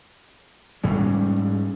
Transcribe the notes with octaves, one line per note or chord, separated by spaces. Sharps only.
G#2 G3 C#4